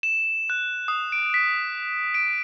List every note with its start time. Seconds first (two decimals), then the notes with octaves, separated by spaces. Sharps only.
0.03 E7
0.50 F#6
0.88 D#6
1.12 D7
1.34 B6
2.14 D7